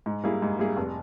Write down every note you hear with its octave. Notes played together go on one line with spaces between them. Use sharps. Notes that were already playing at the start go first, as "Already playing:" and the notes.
G#2
G3 A#3 E4 G#4
G#2
G3 A#3 E4 G#4
F1